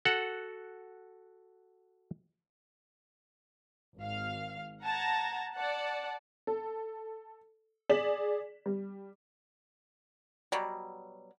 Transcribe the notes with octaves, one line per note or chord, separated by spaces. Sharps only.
F#4 A4 F#5
G#1 F5
F#5 A5 A#5 G#6 A#6
D5 F#5 A5
A4
G#4 D5 B6 E7 F#7
G3
B2 F#3 G3